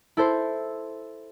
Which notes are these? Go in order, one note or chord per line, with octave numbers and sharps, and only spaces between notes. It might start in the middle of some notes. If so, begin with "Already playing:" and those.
E4 A4 C5